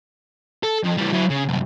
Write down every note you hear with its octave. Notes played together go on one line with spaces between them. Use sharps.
A4
F2
E3 G3
F#3 E4
C#3
C2 F#2